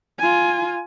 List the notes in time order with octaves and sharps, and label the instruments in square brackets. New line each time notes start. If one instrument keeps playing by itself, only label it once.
[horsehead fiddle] F4 G#5